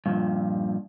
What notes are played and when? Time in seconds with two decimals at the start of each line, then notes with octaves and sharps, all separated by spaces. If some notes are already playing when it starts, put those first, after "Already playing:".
0.06 G2 A#2 F3